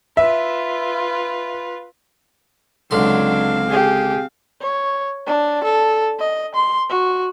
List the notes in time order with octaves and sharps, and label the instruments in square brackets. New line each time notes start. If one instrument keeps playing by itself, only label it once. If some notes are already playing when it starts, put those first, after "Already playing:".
[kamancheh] F4 B4 [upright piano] E5
[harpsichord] C#2 D3 C6 [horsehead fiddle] F#3 D4 [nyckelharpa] C4 F5
[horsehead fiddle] G4 G#4
[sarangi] C#5
D4
A4
D#5
C6
F#4